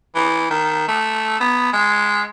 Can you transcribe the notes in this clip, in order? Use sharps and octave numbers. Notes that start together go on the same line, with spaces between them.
E3
D#3
A3
B3
G#3